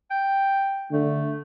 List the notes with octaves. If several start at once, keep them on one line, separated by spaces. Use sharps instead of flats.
G5
D3 A3